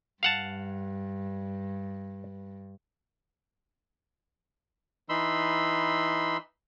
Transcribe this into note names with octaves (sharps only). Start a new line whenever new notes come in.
G2 F5 F#5 A5
E3 D#4 B5 C6 E6